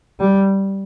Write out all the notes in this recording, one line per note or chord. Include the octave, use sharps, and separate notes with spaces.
G3